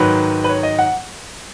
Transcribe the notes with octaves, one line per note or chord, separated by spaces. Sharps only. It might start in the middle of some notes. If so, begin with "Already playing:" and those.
Already playing: G#2 D#3 F#3 B4
B4
C#5
D#5
F#5